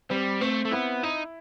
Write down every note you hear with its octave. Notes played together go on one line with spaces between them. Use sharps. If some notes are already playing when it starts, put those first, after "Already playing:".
G3 C4
A3 C4
A3
B3 E4
D#4 E4